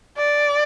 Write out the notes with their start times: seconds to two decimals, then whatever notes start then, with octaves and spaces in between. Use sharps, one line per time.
0.17 D5